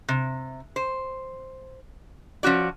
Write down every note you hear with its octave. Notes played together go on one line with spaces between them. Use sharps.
C3
C5
F3 C#4 F#4 D5